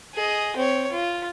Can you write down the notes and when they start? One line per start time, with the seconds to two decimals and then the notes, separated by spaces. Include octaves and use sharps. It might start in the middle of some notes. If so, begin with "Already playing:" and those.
0.15 G#4 D#5
0.56 C4 C#5
0.91 F4